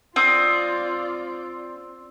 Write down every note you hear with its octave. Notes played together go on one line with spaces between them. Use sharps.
C4 F4 D5 D#6